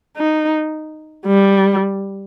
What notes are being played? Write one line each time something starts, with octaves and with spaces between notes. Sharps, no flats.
D#4
G3